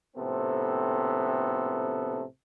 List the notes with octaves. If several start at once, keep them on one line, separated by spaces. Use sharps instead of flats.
A#1 A2 C3 B3 C4 A4